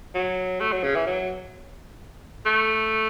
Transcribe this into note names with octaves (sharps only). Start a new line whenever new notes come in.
F#3
A3
F#3
C#3
E3
F#3
A3